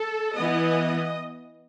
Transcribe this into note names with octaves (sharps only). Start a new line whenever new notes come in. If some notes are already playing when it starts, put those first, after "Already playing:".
Already playing: A4
E3 B3 D#5